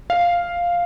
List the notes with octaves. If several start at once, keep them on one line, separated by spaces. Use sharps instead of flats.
F5